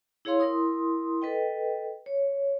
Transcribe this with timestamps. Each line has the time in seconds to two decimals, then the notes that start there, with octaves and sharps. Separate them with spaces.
0.25 E4 G#4 C#5 F5 C6
0.40 E4 A#4 C6 D#6
1.22 A4 B4 D#5 G5
2.06 C#5